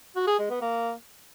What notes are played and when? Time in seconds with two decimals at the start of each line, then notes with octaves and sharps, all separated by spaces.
0.16 F#4
0.27 G#4
0.39 G#3
0.50 B3
0.61 A#3